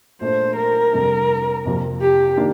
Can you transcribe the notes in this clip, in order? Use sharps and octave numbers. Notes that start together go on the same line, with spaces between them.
A#2 A3 D4 C5
A#4
F2 C3 G3 D4 A4
F2 C3 F3 A#3 F4
G4
D#3 A#3 D4 G4